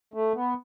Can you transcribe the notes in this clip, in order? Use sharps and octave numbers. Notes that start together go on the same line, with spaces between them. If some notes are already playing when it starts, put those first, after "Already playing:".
A3
B3